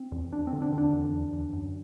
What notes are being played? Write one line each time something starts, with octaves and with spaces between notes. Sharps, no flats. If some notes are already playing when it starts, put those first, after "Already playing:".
Already playing: C4
E2
E2 D4
C4
D3
D4
D3
D4
E2
E2
E2
F#2